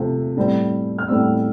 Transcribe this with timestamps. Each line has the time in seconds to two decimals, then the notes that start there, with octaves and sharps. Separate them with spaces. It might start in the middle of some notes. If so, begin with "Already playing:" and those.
Already playing: C3 F3 A3 C4
0.37 A2 G3 C4
0.98 F6
1.08 A2 G3 C4 E6